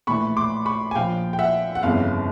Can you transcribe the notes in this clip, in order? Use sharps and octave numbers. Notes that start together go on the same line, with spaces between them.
A#1 A2 E3 B5 C#6
C6 D6
B5 C#6
G#5
A#1 A#2 F3 F5 G5
G5
E5 F#5
F#5
G1 F2 C#3 E3 F5